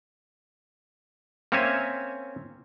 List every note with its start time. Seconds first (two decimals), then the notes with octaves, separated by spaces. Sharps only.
1.52 A#3 C4 C#4 C#5 E5 G#5